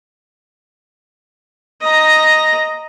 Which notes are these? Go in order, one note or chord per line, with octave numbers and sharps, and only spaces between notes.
D#5 A#5